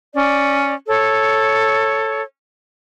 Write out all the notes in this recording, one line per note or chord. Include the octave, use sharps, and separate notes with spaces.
C#4 D5
A4 C#5